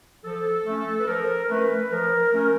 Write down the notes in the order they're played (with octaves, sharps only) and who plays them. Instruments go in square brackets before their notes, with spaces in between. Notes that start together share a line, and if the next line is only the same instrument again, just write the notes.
[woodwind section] F3 A4
A3 C#4
B4
F3 A#4
A3 C#4 B4
F3 A#4
A3 C#4